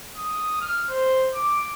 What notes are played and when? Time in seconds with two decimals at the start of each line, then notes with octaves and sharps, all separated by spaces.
0.17 D#6
0.61 F6
0.89 C5
1.34 D6